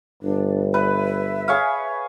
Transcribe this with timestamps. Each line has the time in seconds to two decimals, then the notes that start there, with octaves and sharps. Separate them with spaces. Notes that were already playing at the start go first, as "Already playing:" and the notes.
0.23 G1 D4
0.74 B4 E5
1.48 G#4 C#5 F5